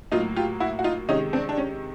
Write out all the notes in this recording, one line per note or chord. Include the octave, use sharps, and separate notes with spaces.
A2 F#3 A#3 D#4 F4
F4 G4
E4 F#4
F#4
D#4 F4
C3 D#3 G#3 C#4 D#4
C4 D4
D4
C#4